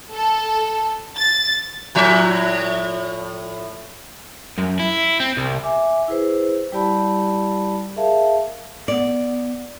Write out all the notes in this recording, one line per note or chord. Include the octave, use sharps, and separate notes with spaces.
A4
A6
A2 F3 E5
F#2
E4
C4
C2
E5 G#5 D6
E4 G#4 B4 C5
G3 E4 G4 D5 A5 B5
G#4 A#4 E5 F5 A5
B3 D5